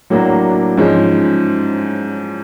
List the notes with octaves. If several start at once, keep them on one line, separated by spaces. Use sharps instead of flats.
A2 F#3 A#3 D4 F#4
G#2 F3 G#3 C#4